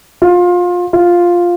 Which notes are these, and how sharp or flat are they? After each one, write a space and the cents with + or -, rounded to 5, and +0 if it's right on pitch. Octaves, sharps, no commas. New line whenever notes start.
F4 +25
F4 +5